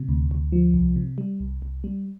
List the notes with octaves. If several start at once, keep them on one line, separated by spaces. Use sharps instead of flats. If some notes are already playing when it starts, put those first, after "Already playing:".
Already playing: C3
D2
D2
F3
C2
C3
G3
C2
C2
G3